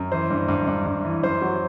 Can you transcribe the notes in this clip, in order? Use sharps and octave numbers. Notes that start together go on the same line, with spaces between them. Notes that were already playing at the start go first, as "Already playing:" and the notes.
Already playing: F#2
E3 C5
G2
G2
G2
G2
E3
F#2 C5
F#3